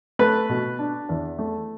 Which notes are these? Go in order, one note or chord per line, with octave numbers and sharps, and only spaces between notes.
A3 B4
B2
D4
E2
A3